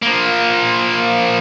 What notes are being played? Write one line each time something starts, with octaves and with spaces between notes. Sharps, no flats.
F3 A#3